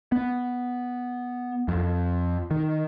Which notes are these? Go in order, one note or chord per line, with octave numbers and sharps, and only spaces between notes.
B3
F2
D#3